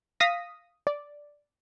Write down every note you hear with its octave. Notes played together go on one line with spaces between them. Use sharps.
F5 D#6 A#6 B6
D5